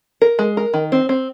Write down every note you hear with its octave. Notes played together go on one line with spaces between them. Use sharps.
A#4
G#3
A#4
D#3
C4
C4